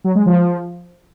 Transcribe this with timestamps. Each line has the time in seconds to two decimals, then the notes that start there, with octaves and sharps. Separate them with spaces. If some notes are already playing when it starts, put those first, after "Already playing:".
0.04 F#3
0.15 G#3
0.26 F3